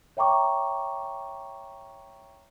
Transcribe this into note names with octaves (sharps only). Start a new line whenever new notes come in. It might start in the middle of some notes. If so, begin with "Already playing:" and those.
C#5 E5 G5 A#5 C#6 D6